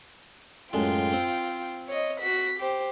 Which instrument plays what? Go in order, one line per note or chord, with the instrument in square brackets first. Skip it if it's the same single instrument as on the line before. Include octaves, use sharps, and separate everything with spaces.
[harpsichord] F#2 A2 G#3 [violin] F4 G5
[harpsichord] C4
[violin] C#5 D#5
F#4 B6
G4 C5